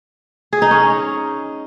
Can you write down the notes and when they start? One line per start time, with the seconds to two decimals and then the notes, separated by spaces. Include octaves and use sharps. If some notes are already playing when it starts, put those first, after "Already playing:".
0.53 G#4
0.62 D#4
0.71 C#4